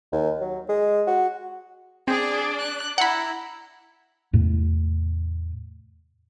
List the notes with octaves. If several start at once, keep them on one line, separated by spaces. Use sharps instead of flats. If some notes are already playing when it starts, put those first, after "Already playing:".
D#2
F#3
G#3
F#4
C4 D4 G#4 D5
F#6
E4 F#5 A#5 B5
E2 A2 C3 A3